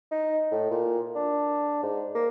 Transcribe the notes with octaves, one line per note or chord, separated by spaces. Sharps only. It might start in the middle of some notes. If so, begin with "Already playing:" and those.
D#4
A2
A#2
D4
G#2
A#3